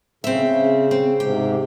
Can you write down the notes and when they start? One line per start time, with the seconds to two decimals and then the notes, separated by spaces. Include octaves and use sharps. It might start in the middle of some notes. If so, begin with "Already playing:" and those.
0.24 C#3 C4 E5
0.42 C#3
0.91 C4
1.20 G#2 C3 G4